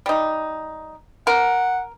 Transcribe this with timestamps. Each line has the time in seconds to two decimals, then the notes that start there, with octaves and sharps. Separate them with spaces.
0.06 G3 D#4
1.27 A#4 F#5